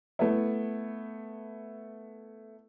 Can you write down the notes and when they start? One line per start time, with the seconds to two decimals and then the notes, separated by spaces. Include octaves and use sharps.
0.19 A3 B3 E4